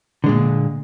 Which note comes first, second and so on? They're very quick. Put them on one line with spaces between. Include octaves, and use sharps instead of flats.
D3 G#3 A#2